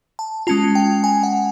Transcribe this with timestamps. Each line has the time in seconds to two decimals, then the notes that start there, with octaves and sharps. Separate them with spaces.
0.19 A5
0.47 G#3 C#4 F4 A5
0.75 G5
1.04 G#5
1.23 F#5